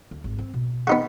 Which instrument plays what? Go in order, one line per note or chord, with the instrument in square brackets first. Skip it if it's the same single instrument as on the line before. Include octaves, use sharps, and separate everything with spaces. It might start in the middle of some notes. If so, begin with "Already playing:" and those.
[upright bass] D2
G#1
C4
B2
[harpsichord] B3 D#4 F#4